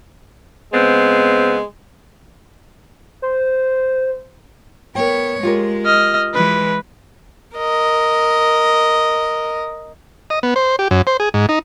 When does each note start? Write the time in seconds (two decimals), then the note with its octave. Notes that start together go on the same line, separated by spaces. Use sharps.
0.73 C#3 G#3 B3 C4
3.22 C5
4.95 B3 A#4 C#5 G5
5.43 G#3 F4 G4 A#4
5.86 D#5 F6
6.34 E3 G#3 B4
7.56 A#4 D#5
10.30 D#5
10.43 B3
10.56 C5
10.79 G4
10.91 F#2
11.07 C5
11.20 G#4
11.34 G#2
11.49 D#4